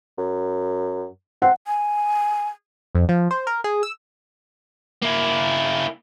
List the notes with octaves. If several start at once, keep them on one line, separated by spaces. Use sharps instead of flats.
F#2
C4 F#5
G#5
F2
F3
C5
A#4
G#4
E6
A#3 E4